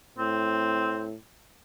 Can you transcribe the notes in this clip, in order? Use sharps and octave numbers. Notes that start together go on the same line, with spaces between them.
A2 C4